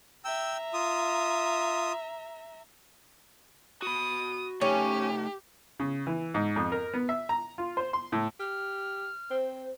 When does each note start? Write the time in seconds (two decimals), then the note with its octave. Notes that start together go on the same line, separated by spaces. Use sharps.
0.25 E5 G5 A#5 E6
0.73 F4 D#6
3.82 F#4 B5 D#6
4.61 A3 C#4 D#4 G4
5.80 C#3
6.07 E3
6.34 G#2
6.56 F2
6.72 A#4
6.94 B3
7.09 E5
7.29 A#5
7.58 F4
7.77 C5
7.93 C6
8.12 A2
8.40 G4 F6
9.31 C4 C5